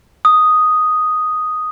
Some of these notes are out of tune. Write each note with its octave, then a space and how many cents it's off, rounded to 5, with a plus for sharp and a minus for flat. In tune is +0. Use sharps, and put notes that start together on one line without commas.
D#6 +0